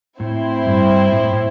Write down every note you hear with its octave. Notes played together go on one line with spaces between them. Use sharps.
A2 C4 E4 C5
G2
A2
A2